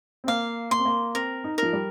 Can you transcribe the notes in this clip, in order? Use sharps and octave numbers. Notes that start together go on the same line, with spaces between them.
C4
A#3 F5
A#3 C6
C4
A#3
C4 A#4
D#4
F3 A#4
G3